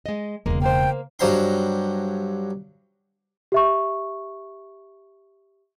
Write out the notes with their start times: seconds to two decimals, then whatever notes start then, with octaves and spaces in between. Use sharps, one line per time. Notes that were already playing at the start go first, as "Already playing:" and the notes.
0.06 G#3 D#5
0.46 E1 C#3 G#3 A#3
0.62 A#3 C5 G5
1.19 G2 F#3 C5 A#5 C6
3.52 G4 E5 C#6